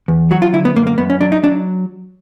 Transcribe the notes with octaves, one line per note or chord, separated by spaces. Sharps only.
E2
F#3 F#4
F4
D3 E4
B3
F#2 A#3
A#3
F#2 B3
C#4
F#3 D4
D#4
F#3 D4